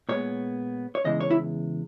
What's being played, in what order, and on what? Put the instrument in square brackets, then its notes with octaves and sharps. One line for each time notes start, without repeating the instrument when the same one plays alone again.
[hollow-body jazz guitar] A#2 G#3 B3 C#5
C#5
E2 C#3 E3 G#3 D#5
C#5
E4